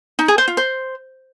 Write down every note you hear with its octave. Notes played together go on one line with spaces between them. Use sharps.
D#4
G#4
C5
F4
C5